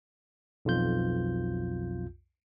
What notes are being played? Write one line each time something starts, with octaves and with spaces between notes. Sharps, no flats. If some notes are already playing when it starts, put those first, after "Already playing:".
B1 F2 F4 G6